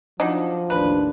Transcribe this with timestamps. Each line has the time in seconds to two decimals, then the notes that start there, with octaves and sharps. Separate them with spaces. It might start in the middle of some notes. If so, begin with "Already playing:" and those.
0.20 F3 F#3 D4 D#4
0.70 A1 D#2 D4 B4